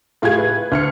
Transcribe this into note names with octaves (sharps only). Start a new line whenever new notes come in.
A2 F4 G4 G#4 G#6
B4
D2 F6 C#7